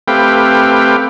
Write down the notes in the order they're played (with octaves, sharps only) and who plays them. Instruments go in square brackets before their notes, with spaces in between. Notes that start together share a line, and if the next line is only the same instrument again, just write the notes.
[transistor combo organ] A3 C4 G4 B4 F5 G5